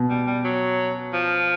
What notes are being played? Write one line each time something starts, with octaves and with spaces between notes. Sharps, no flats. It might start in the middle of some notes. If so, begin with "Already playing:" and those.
Already playing: B2
G3
G3
F#3
F3